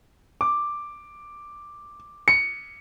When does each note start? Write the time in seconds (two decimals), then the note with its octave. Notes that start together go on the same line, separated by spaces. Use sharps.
0.41 D6
2.28 C#7